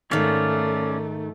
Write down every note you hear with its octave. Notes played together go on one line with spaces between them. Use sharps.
G#2 D#3 A3 C#4 D5 F5